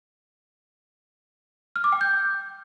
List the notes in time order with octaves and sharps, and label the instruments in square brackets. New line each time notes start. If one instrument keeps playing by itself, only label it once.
[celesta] F6
D6
G5
G6